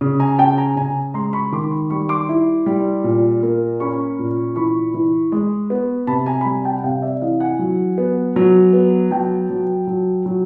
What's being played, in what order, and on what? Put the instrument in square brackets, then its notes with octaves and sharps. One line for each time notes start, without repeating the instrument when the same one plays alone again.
[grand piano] C#3
G#5 A#5
C#3 G5 A5
G#5 A#5
C#3 G#5 A#5
G#3 A#5 C6
B5 C#6
D#3 C6 D6
B5 C#6
G3 B5 C#6
C6 D6
E4
G3
A#2
A#3
C#4 B5 C#6
A#2
E3 B5 C#6
E3
G#3
B3
C3 A5 B5
G#5 A#5
B5
G3 G#5 A#5
G5 A5
F#5
C3 F5 G5
D5 E5
E3 D#5 F5
F#5 G#5
F#3
B3
F#3
B3
F#3 G5 A5
F#3
F#3
F#3